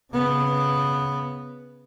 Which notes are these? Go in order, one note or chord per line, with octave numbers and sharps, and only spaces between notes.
C#3 B3